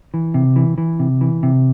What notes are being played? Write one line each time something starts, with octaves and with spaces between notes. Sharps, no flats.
E3
C3
E3
E3
C3
E3
C3